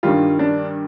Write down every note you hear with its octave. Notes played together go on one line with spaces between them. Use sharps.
G2 D#3 G3 F4
D4